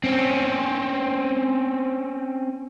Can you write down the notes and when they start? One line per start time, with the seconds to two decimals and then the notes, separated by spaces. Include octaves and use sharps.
0.04 C4 C#4